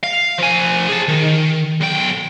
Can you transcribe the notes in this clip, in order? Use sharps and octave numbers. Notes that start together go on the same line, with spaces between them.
F5
F3 G#5
G#4 A5
D#3
B1 G5